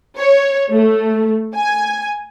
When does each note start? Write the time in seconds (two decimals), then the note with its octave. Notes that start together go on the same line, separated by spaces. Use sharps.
0.18 C#5
0.72 A3
1.56 G#5